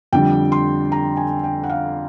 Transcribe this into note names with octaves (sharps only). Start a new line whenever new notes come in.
F2 D3 G3 G5
C6
A#5
G#5
G5
F#5
F5